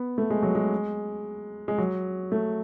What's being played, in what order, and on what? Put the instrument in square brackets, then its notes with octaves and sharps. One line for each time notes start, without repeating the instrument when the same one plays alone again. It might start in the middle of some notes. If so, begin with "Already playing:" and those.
Already playing: [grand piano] B3
A3
G#3
F#3
G#3
G#3
F#3
A3